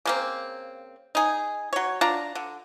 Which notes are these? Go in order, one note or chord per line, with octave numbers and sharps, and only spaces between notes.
C#3 A#3 C4
D#4 G#4
F#3 C#5
D4 F4 A#5
D3